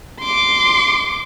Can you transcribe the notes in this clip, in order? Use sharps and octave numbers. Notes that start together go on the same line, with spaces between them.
C6 D6